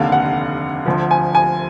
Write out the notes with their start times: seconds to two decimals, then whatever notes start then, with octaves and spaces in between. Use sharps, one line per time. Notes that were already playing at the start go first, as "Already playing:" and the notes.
Already playing: F1 D#2 D3 F5
0.12 F#5
0.86 D2 D3 F3
1.11 G#5
1.35 G#5